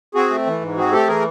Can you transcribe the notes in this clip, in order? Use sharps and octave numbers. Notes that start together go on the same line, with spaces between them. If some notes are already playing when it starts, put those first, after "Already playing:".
C4 F#4 G#4
A3
E3
G#2
C4 F#4 G#4
A3 G4 A4
E3 G#4 A#4